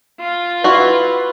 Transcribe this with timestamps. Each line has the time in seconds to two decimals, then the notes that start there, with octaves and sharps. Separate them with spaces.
0.20 F4
0.64 E4 F#4 B4